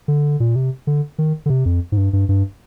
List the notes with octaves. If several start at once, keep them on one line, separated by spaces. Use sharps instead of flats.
D3
A#2
C3
D3
D#3
D3
C3
F2
G#2
G2
G2
G2